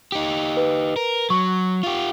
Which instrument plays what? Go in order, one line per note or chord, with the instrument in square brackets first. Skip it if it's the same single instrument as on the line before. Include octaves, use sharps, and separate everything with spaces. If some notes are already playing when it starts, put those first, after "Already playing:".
[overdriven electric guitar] D#4 G4
[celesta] B4
[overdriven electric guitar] A#4
[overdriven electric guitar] F#3 [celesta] C#6
[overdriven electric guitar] F4 G4